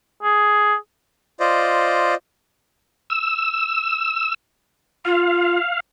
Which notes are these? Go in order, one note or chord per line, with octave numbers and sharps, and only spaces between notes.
G#4
F4 C5 D5 D#5
E6
F4 F5